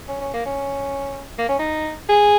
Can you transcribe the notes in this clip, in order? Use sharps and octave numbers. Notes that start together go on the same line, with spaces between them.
C#4
C#4
A#3
C#4
A#3
C#4
D#4
G#4